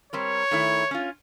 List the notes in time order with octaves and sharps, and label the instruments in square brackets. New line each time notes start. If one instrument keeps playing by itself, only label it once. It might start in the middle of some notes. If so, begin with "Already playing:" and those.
[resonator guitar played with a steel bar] G3 C4 A#4 [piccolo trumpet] C#5
[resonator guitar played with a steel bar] D#3 A3 E4
C#4 F4